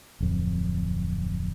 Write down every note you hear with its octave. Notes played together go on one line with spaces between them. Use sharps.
D1 F2